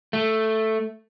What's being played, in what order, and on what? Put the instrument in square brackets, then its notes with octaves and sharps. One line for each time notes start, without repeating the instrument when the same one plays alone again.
[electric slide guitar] A3